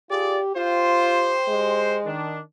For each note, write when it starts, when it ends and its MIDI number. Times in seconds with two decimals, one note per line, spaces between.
0.11 0.39 65
0.11 0.52 67
0.11 0.39 68
0.11 0.39 74
0.57 1.38 65
0.57 1.98 67
0.57 1.98 72
1.48 2.10 56
2.05 2.40 51
2.05 2.40 62